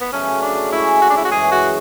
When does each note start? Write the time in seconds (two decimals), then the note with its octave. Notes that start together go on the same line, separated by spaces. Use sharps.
0.01 B3
0.13 C#3 F#3 A3 C#4
0.42 D4
0.72 C#3 G#3 C#4 E4
1.02 F#4
1.10 D4
1.17 E4
1.25 F#4
1.31 F#2 E3 G#3 G#4
1.51 F#4